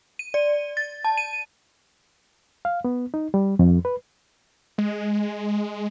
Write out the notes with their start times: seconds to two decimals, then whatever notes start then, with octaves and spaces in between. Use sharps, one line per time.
0.19 D#7
0.34 D5
0.77 A6
1.05 A5
1.18 D#7
2.65 F5
2.85 B3
3.14 D#4
3.34 G3
3.59 F2
3.85 B4
4.78 G#3